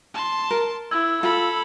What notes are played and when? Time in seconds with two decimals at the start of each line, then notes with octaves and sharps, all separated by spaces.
0.14 A5 C6
0.51 A#4
0.91 E4 E6 G#6
1.23 F4 A4 B5